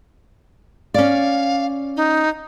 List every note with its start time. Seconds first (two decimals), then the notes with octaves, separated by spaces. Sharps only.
0.94 C#4 D5 F5
1.97 D#4